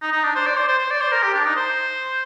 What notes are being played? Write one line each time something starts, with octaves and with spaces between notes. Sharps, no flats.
D#4
D#4
D4
C5
D5
C5
C5
C5
D5
C5
A#4
G4
D4
D#4
C5